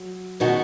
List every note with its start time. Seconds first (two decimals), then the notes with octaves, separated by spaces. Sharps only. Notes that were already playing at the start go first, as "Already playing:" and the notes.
Already playing: F#3
0.40 B2 D#3 G#3 D#4 F#4